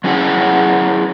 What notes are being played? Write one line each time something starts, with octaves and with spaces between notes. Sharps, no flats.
F#3 C#4 E4 G#4 F#5